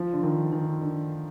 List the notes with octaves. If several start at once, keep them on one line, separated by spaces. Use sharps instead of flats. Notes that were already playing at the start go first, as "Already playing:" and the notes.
Already playing: F3
D3
D#3
D#3
D3